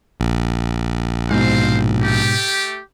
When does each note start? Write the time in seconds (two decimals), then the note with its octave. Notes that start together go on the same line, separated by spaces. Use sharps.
0.20 A#1
1.31 G#2 B2 C4 C5 F5
2.01 A3 G4